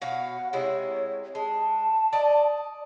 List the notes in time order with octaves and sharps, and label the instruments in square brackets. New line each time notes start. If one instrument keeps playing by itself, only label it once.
[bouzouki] B2 C#5 F5 [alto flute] F#5
[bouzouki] C3 G#3 E4 [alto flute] C#5
[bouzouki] G#3 [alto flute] A5
[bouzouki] D5 D#5